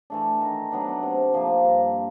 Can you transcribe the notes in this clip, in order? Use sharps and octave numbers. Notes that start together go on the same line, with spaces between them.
E3 A3 D4
D#3
F#3 B3 D4
C3
F3 A#3
G2